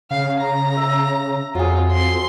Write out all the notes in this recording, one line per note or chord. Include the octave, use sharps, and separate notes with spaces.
C#3 F5
A#5
E5
F2 F#3 F4 G#4
C6